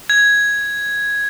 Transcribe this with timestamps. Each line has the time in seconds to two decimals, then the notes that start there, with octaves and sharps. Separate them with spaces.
0.10 G#6